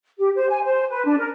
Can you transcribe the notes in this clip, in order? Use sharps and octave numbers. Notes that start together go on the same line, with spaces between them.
G4
C5
G#5
C5
B4
D4
A#4